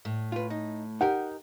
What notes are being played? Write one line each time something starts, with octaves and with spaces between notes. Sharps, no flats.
A2
F4 B4
D#4
D#4 G4 A#4 F#5